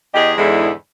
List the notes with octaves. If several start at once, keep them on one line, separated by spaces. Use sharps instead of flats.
E2 G4 G#4 D#5
E2 G#2 D3 G#3 E4